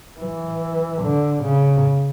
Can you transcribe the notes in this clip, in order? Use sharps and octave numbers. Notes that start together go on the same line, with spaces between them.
E3
D3
C#3